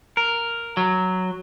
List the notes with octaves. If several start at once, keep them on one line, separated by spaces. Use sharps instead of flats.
A#4
F#3